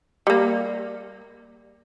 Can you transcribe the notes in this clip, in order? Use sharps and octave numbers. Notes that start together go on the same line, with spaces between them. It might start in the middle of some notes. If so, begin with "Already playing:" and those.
G3 A#3